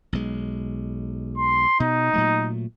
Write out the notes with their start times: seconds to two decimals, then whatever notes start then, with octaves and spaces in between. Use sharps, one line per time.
0.13 B1 G#3
1.38 C6
1.80 B2 D#4
2.13 A#2 F#3 A3